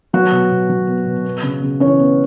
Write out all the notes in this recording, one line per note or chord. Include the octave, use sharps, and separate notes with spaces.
F#3 B3 F#4
B2
B2
F#3
B3
B2
B3
C#3
C#3
E3 C#4 C#5
B3